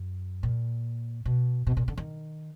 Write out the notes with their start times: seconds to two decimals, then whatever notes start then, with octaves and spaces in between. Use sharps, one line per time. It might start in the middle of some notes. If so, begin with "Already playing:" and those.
Already playing: F#2
0.43 A#2
1.25 B2
1.67 B2
1.77 A#2
1.88 D3
1.98 D#3